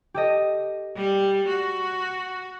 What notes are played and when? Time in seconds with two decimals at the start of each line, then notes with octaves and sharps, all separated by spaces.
0.14 G4 A4 D#5
0.96 G3
1.48 F#4